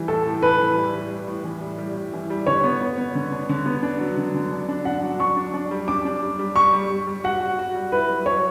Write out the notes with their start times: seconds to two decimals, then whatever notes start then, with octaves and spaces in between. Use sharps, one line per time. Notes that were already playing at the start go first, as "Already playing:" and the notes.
Already playing: E3 G3
0.08 A2 A4
0.25 A2
0.42 E3 B4
0.60 E3
0.76 G3
0.93 G3
1.11 G3
1.28 A2
1.44 E3
1.61 G3
1.78 G3
1.96 A2
2.13 E3
2.30 G3
2.47 D3 C#5
2.64 B3
2.81 B3
2.98 B3
3.15 D3
3.32 D4
3.49 D3
3.66 B3
3.83 D4
4.00 F#3
4.17 D3
4.34 D3
4.51 D4
4.69 D4
4.85 D4 F#5
5.02 F#3
5.19 D4 C#6
5.37 D4
5.54 D4
5.71 G3
5.88 D4 D6
6.05 D4
6.23 G3
6.39 G3
6.56 G3 C#6
6.73 G3
6.91 G3
7.07 G3
7.24 F#4 F#5
7.41 F#4
7.59 F#4
7.75 G3
7.92 E4 B4
8.10 F#3
8.26 F#3 C#5